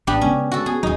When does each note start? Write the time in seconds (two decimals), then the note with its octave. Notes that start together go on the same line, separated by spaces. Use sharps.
0.07 A1 B3 D4 G4
0.21 C#3 G#3 B3 C#4
0.52 F#4 A4
0.66 B3 G#4
0.83 D#1 G#2 F#3 D#4 G#4